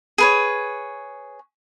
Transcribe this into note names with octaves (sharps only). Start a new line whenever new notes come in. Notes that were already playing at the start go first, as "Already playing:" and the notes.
G#4 B4 C#5